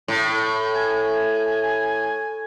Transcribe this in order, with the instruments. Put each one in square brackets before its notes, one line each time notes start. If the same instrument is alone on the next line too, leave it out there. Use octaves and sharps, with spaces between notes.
[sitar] A2
[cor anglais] G#5